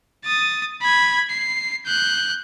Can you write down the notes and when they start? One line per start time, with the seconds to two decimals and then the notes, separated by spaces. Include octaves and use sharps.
0.25 D#6 A6
0.82 B5 G#6
1.30 C7
1.86 F#6 G6